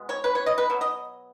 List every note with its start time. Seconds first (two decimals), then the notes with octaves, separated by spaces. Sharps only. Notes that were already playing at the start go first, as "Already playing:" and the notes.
Already playing: B2 G#3 B3
0.09 C#5
0.24 B4
0.35 C#5
0.46 D#5
0.58 B4
0.70 B2 F#3
0.81 D#5